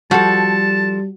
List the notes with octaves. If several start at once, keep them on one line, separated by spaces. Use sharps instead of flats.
F3 G3 F#4 A4 A5